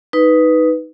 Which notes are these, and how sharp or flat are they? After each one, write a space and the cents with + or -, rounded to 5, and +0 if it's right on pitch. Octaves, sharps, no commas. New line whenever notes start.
D#4 +10 B4 +0